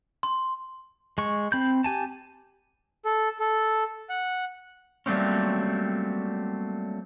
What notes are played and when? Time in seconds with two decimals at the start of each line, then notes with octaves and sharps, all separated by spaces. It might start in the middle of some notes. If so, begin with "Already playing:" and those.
0.23 C6
1.18 G#3 C#6
1.52 C4 B5 G6
1.84 G4 G#5 A5
3.05 A4
3.39 A4
4.10 F#5
5.06 F#3 G3 A3 A#3 C4 C#4